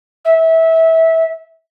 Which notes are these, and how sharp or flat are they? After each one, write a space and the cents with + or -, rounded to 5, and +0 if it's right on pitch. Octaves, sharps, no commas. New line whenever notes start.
E5 -20